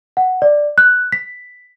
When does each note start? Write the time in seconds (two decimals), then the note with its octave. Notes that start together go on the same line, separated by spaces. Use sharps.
0.17 F#5
0.42 D5
0.78 F#6
1.12 B6